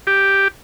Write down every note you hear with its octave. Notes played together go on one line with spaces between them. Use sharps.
G4